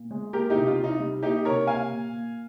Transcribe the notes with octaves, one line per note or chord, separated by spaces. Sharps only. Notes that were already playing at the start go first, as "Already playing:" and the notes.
Already playing: A#2
G#3
A#3 G4 A#4
D#4 G4
C3
F4
C3
D#4
G3
A#3 D#4 G4
C3 A#4 C#5
A#3 F5 G#5
A#2
A#2